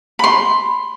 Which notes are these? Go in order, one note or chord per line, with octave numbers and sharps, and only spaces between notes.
B5 C6